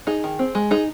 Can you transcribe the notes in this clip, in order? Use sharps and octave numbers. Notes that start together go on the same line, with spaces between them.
D#4 G#4
D#3
C4
G#3
D#4 G#4